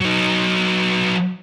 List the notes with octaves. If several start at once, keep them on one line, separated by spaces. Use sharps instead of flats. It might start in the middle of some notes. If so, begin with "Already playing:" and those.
F#3 D#4